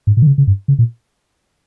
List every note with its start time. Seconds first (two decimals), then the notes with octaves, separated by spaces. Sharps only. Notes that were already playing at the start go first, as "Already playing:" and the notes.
0.07 G#2
0.17 A#2
0.22 D#3
0.27 C#3
0.38 C#3
0.47 G2
0.68 C#3
0.79 A#2